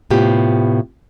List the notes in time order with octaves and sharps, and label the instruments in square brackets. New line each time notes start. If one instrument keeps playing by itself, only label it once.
[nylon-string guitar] A2 C3 B3 F4 G4